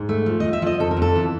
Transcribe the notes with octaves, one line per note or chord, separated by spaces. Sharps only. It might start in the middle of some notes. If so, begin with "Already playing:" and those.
Already playing: G#2
A3
F3
F3 D#5
E5
F3 D#5
F2 A4
A#4
F2
A4
E3